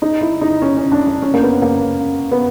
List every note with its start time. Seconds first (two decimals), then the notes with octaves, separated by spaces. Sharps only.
0.02 D#4
0.21 E4
0.41 D#4
0.62 C#4
0.77 C#4
0.92 D4
1.06 D4
1.22 C#4
1.34 A#3
1.42 B3
1.62 A#3
2.32 B3